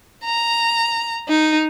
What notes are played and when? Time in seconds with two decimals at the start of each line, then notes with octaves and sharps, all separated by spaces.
0.24 A#5
1.28 D#4